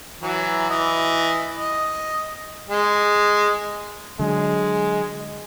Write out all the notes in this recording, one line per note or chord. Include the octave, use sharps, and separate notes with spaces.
E3 F#3
E3 D#5
D#5
G#3
D3 F#3 G#3